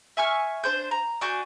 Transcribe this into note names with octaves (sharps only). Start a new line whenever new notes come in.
E5 G#5 C#6 F6
D4 C5 G6
A#5
D4 F#4 G#5 G6